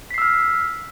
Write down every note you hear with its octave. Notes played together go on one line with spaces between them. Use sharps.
E6 F6 B6 C7